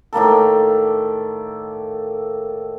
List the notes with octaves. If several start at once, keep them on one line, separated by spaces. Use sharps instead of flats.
A2 D#3 A#3 A4